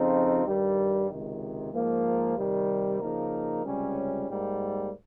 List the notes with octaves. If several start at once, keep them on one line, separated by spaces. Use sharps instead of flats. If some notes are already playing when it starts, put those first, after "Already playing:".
Already playing: F2 C#3 F3 C4 D#4
G2 D#3 G3
C#2 C3 D#3
G#2 F3 A#3
C3 D#3 G3
C#3 F3 A#3 D#4 A#4
C#2 C3 G3 C#4
G#2 G3 A#3